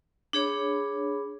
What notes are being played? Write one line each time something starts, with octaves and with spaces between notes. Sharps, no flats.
D4 G#4 C#5 B5